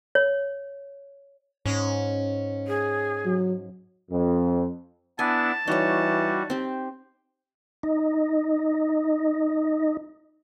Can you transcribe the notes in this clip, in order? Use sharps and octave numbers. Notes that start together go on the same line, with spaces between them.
C#5
G#2 C#4
G#4
F#3
F2
B3 D4 E4 G#5 A5
E3 G3 D#4 F#4 C#5
C4 G4
D#4 D#5